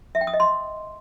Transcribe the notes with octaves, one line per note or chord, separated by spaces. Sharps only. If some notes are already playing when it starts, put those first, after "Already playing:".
E5
G5
D#6
D#5
C6